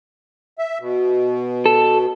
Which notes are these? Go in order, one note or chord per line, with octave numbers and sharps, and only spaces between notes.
E5
B2
A4